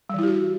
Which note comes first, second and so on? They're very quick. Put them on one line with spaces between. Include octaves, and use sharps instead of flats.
G3 E3 E4 G4 F#4